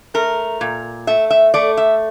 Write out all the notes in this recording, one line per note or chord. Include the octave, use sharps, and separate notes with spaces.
A3 A#4
A#2
A3 E5
E5
A3 D5
E5